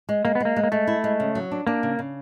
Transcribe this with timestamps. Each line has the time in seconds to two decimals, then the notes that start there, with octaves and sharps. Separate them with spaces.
0.09 G#3
0.25 G#3 A#3
0.35 B3
0.40 G#3 A#3
0.56 G#3
0.63 A#3
0.72 G#3 A3
0.87 E4
1.04 G#3
1.20 C#3
1.35 F#3
1.51 D4
1.67 A#3 D4
1.83 C#3
1.99 C#3